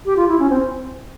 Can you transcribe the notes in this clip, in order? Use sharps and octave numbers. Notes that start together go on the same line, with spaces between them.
G4
F4
E4
C#4
C4